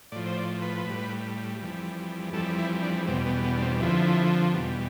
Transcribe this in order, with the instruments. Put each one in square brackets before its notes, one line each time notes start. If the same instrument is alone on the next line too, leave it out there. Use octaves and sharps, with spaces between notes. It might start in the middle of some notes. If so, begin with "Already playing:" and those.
[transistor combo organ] A2 F3 D5
C5
D5
B4
A2 G3
F2 E3 G3
F2 E3 G3 A4
E4
D4
E2 B2 G3 C4
B3
B3
D4
C4
F2 D3 F3 E4
E2 B2 G3